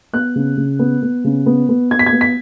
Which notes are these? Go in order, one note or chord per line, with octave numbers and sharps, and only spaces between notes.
B3 F#6
C#3
C#3
B3
B3
C#3
B3
B3
B3 G#6
B6
G#6
B3
B6